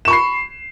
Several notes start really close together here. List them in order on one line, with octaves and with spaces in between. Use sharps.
E7 C#6 B5 C7